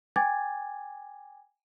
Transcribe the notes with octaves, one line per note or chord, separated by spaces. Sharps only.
G5 G#5 D6 G#6 A6